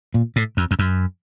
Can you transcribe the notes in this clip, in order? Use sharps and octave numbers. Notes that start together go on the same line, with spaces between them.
A#2
A2
F2
F2
F#2